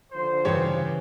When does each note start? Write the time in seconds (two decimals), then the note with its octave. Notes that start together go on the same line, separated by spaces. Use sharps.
0.13 D3 F3 C5
0.45 G2 C#3 E3 G4 C#5